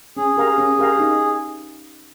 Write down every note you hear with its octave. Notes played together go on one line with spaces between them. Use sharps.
C#4 G#4
G4 A#4 F5 A#5
C#4
G4 A#4 F5 A#5
D#4